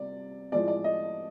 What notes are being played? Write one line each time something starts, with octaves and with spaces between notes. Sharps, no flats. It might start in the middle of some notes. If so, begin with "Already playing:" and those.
Already playing: C3 G3 D5
A2 F3 G#3 D5
D5
D#5